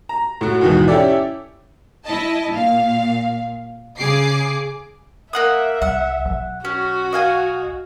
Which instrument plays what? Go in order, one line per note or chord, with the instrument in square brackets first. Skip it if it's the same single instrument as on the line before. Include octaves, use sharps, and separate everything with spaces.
[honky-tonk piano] A#5
A2 F#4
D#2 G#2 B2 E3
C#4 E4 G4 A4 D5
[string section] E4 D#5 A5
A#2 F5
C#3 G#4 D6 C7
[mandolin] A#3 F#5 D#6 [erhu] E5
[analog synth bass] C2 [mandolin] F#5
[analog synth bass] B1
[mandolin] C#4 [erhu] F#4
[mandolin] D#5 F5 G#5